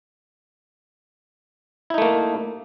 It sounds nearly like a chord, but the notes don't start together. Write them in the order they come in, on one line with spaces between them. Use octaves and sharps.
E4 D#4 A3 A#3